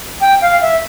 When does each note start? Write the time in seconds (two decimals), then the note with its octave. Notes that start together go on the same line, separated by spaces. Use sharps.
0.21 G5
0.41 F5
0.61 E5